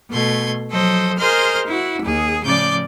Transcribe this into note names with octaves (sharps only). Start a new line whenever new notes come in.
B2 A3 C6 G#6
F3 F#3 A4 C5 D#5
G#4 A#4 C5 D#5 C6 F6
E4 F#4
D#2 G#4
A2 C#3 F3 D5 D6 G6